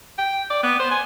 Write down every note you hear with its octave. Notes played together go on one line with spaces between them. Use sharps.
G5
D5
B3
C5
G#5